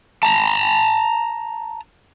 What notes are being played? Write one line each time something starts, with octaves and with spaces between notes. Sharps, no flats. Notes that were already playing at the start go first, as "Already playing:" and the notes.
A5 A#5